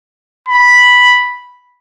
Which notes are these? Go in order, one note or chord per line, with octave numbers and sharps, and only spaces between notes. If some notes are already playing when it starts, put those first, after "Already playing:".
B5